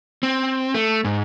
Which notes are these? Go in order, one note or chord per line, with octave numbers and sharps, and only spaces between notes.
C4
A3
G#2